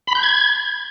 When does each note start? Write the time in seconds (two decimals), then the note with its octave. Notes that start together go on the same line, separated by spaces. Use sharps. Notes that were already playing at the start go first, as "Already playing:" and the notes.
0.07 B5
0.15 G6
0.23 G#6